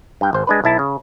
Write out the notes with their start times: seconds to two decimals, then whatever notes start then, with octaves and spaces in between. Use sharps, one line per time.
0.21 G2 G5
0.33 G#1 C5
0.47 G#3 D4 B4
0.64 B1 E4 A5
0.79 C#3